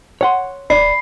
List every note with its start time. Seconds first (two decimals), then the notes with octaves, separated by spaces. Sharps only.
0.21 C#5 F#5 C6
0.70 D1 D5 B5 C7